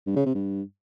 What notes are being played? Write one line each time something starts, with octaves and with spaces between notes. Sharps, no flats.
G2
C#3
C3
G2